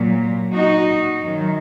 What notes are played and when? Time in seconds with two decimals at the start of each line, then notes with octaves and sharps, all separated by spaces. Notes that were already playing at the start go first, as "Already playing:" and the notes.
Already playing: A#2 F#3
0.54 D#4 F#4
1.20 F#2 D#3 F#3